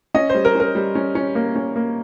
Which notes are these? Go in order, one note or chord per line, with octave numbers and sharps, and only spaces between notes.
C#4 D#5
G3 C5
A#4
C#4 A#4
G3
C#4
C#4
A#3
C#4
A#3